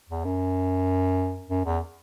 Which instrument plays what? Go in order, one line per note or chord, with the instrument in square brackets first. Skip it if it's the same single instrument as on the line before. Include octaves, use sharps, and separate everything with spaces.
[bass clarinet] E2
F#2
F#2
E2